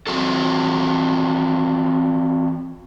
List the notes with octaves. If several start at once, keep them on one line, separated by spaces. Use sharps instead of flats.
E3 C4 F#4 A4